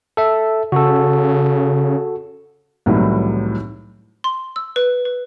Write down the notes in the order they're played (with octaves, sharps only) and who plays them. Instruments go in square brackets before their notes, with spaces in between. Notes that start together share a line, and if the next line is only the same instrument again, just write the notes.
[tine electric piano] A4 E5
[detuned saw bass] C#3 [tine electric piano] F#4 A4
[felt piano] C2 A2 D#3 E3 F#3
[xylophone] C6
E6
B4
B4